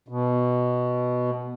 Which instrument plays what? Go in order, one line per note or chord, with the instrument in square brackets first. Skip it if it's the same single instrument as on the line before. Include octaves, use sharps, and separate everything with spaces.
[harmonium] B2